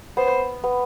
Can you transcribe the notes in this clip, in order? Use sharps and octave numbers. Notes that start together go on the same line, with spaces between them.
B3 C5
B3